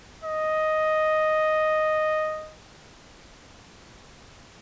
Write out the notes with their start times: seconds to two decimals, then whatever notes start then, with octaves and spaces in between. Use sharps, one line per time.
0.24 D#5